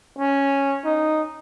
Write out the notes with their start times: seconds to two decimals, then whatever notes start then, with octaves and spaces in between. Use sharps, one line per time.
0.18 C#4
0.85 D#4